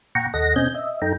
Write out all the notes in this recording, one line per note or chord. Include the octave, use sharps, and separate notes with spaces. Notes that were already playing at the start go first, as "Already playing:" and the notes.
A#2 F#5 G5 A#5 C#6
D#2 A4 D#5 F#5 A#6
B2 C4 C#4 D#5 G#5 G6
D#5 E5
F#2 D#4 A4 G5 A#5